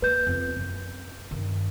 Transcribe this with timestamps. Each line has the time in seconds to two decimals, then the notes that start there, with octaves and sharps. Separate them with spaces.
0.02 A#3 B4 G6
0.27 F2
0.57 F#2
1.31 G2 D#3